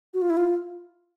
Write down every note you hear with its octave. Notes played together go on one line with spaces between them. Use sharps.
F#4
F4
E4
F4